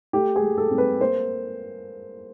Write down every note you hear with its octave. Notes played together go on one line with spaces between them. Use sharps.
A3 G4
G#4
A3
A4
C4
B4
A#3 C5